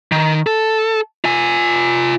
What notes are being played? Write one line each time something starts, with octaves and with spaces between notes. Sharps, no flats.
D#3
A4
F4 G#5